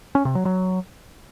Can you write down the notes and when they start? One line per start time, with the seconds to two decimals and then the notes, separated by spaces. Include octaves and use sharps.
0.15 C#4
0.25 C3
0.35 F#3
0.45 F#3